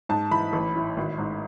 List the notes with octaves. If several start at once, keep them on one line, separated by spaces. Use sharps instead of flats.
G#2 A5
E3 B5
A1
A2
G#1
G#2